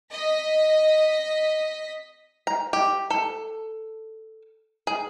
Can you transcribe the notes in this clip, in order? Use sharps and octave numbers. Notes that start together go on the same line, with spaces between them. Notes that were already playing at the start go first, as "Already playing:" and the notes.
D#5 B6
A#5
G4
A4
G#4